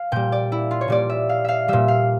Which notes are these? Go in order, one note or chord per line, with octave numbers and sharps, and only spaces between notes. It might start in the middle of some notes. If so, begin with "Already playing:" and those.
Already playing: F5
A#2 G3 G5
D5
E4
F4
C#5
A#2 G3 D5
E5
F5
E5 F5
A#2 G3 E5
F5